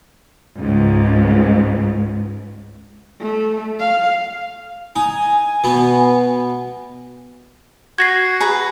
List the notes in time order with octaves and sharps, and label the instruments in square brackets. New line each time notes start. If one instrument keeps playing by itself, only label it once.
[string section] C#2 G#2
[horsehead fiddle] A3
F5
[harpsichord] D#4 [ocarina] G#5
[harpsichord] B2 B3
[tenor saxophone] F#4 [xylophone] G#6 A#6 C7
[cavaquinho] G#4 B4 A#5